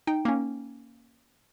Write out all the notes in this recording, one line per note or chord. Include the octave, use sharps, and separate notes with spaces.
D#4 G5
A#3 C#4